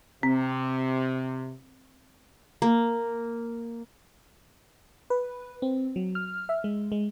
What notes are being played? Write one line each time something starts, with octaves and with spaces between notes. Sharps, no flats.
C3 C4
A#3
B4
C4
F#3
F6
E5
G#3
G#3